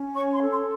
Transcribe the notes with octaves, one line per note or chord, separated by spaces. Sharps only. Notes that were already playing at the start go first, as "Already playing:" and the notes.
Already playing: C#4
C#5 C#6
C6
A4
C6